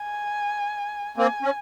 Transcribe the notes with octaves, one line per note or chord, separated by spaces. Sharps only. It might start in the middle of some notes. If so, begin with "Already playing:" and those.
Already playing: G#5
A#3 C4 G#5
C#4